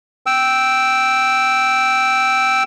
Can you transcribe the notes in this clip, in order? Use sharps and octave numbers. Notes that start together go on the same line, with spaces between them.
G5 E6